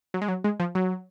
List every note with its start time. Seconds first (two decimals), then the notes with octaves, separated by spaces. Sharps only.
0.14 F#3
0.21 G#3
0.28 F#3
0.44 G#3
0.60 F3
0.75 F#3